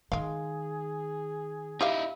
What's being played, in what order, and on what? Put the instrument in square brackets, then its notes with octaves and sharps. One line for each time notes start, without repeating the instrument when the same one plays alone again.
[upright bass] D#3 [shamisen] G#3 F5 [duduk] G#4
[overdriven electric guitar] D#4 E4 [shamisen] G4 E5 F5